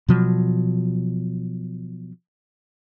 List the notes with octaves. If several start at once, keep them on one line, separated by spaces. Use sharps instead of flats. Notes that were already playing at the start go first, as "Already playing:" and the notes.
B2 F3 F#3